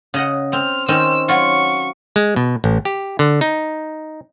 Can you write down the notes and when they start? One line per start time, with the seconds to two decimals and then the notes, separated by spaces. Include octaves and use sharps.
0.14 C#3 D#5 F#5
0.53 C4 F6
0.88 D#3 C4 C#4 E6
1.29 F#3 F4 C#6
2.16 G#3
2.36 B2
2.64 A1
2.85 G4
3.19 D3
3.41 D#4